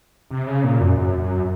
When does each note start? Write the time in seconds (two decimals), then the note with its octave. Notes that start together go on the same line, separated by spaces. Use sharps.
0.31 C3
0.47 C#3
0.64 A#2
0.81 F#2
0.97 F#2
1.19 F#2